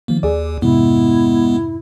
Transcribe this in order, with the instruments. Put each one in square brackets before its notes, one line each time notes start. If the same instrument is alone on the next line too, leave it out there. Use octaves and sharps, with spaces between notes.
[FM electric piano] D#3 F3 [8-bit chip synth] A#3
[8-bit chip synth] D#2 [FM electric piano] G#4 D5
[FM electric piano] F2 G#2 C3 [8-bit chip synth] G#3 B3 [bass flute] E4